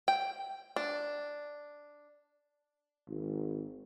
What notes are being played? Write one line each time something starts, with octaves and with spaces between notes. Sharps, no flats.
G5
D4
G#1